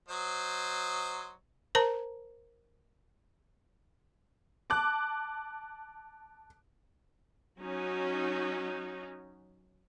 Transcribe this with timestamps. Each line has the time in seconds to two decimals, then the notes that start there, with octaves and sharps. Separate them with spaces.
0.09 F#3 C5 D#5
1.75 A#4 C5 A5 A#5
4.70 A5 D6 F#6
7.59 F#3 C#4 D#4 F#4